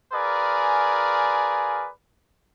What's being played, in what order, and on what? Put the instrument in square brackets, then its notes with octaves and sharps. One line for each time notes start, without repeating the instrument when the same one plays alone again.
[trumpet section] F4 G#4 A#4 B4 D5 G#5